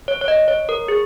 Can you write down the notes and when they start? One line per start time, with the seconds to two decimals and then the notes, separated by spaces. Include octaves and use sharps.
0.08 C#5
0.21 C#5
0.28 D#5
0.48 C#5
0.69 A#4
0.88 G#4